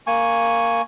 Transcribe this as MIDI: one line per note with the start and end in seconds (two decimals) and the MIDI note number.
0.07 0.82 58
0.07 0.82 80
0.07 0.82 85